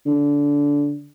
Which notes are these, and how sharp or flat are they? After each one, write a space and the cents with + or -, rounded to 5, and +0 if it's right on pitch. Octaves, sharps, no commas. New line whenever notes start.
D3 -20